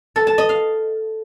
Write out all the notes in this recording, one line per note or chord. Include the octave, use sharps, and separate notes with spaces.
A4
A5
D#5
F5